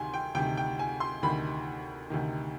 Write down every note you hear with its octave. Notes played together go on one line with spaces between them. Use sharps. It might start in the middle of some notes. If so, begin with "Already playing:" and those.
Already playing: D2 C3 D#3 G#5 C6
G5
D2 C3 D#3 G5
G5
G#5
C6
D2 C3 D#3 B5
D2 C3 D#3